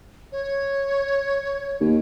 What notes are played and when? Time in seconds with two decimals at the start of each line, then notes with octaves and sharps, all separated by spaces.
0.32 C#5
1.81 D#2